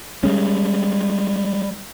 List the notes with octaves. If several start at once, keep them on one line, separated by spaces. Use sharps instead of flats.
G3 G#3 C#4